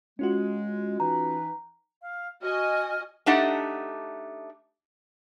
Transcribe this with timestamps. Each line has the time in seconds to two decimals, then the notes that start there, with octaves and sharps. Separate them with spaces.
0.19 G#3 C#4 F4 F#4
1.00 E3 D#4 B4 A#5
2.02 F5
2.42 F#4 D#5 G#5 F6
3.26 A3 D4 D#4 G4 F#5